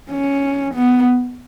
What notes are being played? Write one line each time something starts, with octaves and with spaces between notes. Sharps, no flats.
C#4
B3